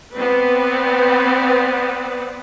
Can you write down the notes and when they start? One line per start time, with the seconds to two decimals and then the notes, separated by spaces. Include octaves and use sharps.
0.14 B3 C4 B4 D5